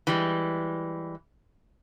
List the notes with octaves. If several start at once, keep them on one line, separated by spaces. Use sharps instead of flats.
E3 G3 G#3